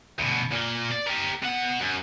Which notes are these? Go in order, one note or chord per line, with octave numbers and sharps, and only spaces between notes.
D2 B2
A#2 A#3
D5
G4 A#4
B2 F#5
F#2